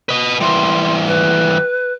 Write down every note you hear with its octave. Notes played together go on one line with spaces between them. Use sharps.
B4 D#5
E3 G3 C6
B4